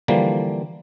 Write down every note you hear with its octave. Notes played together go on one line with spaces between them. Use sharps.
D3 E3 F3 G3 A#3